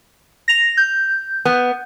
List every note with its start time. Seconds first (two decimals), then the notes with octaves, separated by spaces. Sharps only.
0.48 A#6 F7
0.77 G6
1.45 B3